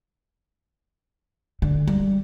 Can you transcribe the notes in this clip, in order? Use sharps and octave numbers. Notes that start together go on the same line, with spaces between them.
D3
G3